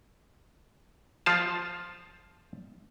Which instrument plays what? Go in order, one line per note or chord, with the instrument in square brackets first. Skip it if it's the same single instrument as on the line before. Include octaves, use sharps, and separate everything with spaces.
[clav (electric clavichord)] F3 F4 A5